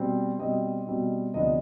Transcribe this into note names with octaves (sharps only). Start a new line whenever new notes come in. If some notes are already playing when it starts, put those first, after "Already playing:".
Already playing: B2 G3 C4
B2 G3 C4 D#5
B2 G3 C4
D2 C3 F3 B3 D4 D#5